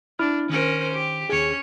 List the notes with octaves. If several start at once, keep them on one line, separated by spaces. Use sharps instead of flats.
D4 E4 B5 F6
D#3 C#4 A#4 C5
G4
D#2 C#4 G#4 C#5